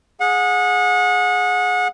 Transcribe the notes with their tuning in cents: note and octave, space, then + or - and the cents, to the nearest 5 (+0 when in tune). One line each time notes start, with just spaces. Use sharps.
G#4 +0 F#5 -30